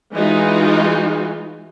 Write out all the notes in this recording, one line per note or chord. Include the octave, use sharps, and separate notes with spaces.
E3 G#3 D#4 F4 F#4